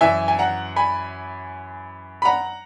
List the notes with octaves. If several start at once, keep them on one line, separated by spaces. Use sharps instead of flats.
F#2 E3 E5 G#5
G#5
F#5 A#5
G#5 B5
B5
F#5 A#5